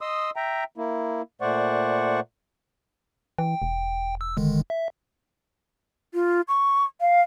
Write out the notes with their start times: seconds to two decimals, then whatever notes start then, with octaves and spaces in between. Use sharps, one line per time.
0.01 D#5 C6 D#6 E6
0.36 E5 G5 A#5
0.78 A#3 E4
1.41 A#2 A3 C5 D5 F#5 C#6
3.38 E3 G5
3.62 E1
4.21 E6
4.37 D3 D#3 G#3
4.70 E5
6.14 F4
6.48 C#6
7.01 F5